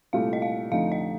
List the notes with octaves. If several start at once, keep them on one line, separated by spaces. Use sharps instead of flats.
C2 A#2 A3 F5
D#5
F5
F2 D3 A3 D#4 F5
D#5